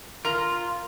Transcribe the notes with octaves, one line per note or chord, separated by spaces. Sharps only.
F4 A#4 A#5